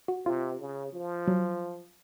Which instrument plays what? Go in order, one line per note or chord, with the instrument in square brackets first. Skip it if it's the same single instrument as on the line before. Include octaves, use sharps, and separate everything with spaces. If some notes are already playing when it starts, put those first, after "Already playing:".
[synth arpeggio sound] F#4
[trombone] C3 [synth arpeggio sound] F4
[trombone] C#3
F3
[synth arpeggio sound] F#3